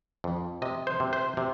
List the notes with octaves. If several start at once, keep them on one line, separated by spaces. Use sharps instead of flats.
F2
C3 D#5
C5
C3
C5
C3